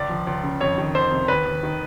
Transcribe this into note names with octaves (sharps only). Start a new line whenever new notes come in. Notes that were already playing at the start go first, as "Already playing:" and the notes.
Already playing: C#2 D5
F3
C#2
C#3
F2 C#5
D#3
F2 C5
C3
D#2 B4
D#2
D#3